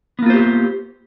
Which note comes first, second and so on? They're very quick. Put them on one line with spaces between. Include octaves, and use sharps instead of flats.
B3 A#3 F4 C5 G4